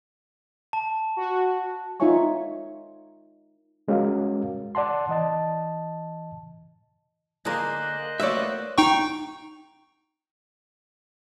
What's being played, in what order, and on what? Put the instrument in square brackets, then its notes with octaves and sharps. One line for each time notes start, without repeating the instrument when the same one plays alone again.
[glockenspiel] A5
[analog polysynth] F#4
[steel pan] D#4 F4 C#5 E5 G#5 C#6
[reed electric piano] G3 G#3 C#4 F#4 A#4 F5
D5 F#5 A5 C6
E3 D#5 A5
[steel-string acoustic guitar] D3 A#3 [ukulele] G#4 A#4 [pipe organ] C5 D#5 F#6
[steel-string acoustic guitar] A3 A#3 F#4 [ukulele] B4 C#5 [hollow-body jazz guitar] D5 E5
[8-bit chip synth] D#4 G5 C#6